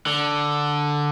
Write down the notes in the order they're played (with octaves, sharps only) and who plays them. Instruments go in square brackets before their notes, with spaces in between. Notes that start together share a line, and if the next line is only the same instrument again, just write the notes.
[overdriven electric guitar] D3